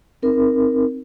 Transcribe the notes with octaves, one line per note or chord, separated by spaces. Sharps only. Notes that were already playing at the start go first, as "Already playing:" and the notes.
C4 D#4 A#4